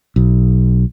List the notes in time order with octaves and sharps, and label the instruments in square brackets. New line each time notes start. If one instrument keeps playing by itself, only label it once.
[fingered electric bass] B1